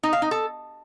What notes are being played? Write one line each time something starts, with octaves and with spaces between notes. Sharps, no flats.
D#4
F5
D#4
A4